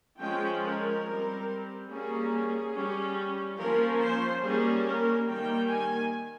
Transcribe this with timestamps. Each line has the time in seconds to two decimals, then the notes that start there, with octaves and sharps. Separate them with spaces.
0.20 F3 G#3 C#4 G5
0.64 A#4
1.06 G3 C4
1.90 G3 A#3 C#4 G#4
2.75 G3 C#4
3.60 F3 A#3 C#4 A#4
4.01 C5
4.43 G3 A#3 C#4 G#4
4.86 A#4
5.28 D#3 G3 A#3 G5
5.70 G#5